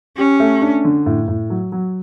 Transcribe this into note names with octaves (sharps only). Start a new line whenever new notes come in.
C#4 G4
A3
D4
D3
A2
A2
F#3
F#3